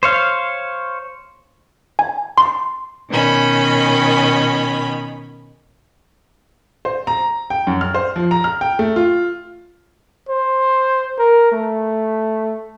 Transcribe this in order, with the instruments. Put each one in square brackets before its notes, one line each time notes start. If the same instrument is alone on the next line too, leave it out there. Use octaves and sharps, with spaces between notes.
[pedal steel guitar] C5 C#5 F5
[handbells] G#5
C6
[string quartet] B2 D#3 C#4 B5
[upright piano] C5
A#5
G5
F#2
F6
C5
F3
A#5
F6
G5
A3
F4
[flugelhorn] C5
A#4
A3